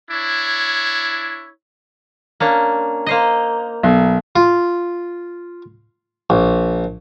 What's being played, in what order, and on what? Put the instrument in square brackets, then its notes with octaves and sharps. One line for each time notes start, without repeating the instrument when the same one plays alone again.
[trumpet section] D4 E4 C#5
[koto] A#3 C#4 D4
A#3 C5 D#5
[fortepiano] B1
[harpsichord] F4
A#1